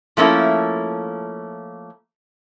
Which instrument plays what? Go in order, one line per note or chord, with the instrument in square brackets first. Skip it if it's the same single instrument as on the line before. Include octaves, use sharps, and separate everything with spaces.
[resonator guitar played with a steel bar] F3 A3 A#3 C#4 E4